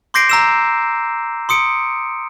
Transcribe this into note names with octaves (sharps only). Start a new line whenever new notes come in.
C6 D6 G6 A#6 C7 D7
A#5 E6 E7
C6 D#6 C#7 D7